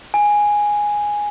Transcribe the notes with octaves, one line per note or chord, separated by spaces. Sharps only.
G#5